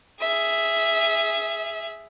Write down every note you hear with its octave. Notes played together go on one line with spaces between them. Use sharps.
G#4 E5